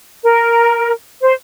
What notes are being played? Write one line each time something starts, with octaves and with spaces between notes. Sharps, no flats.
A#4
C5